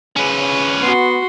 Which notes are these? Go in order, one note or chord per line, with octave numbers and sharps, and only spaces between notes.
C#3 C#4 B4
B3 F#4 C6